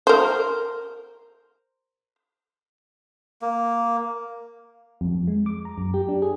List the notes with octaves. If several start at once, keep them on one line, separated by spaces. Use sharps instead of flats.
A#4 C5
A#3
F2
F2
G#3
D6
A#5
F#2
G4
D4
G#4